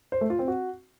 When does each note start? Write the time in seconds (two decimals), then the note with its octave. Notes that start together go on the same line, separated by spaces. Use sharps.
0.12 C5
0.21 A3
0.30 F4
0.39 C4
0.48 F#4